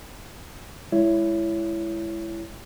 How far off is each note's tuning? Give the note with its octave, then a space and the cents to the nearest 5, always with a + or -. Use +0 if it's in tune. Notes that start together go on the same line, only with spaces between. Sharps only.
G#3 +0 E4 +15 C#5 +15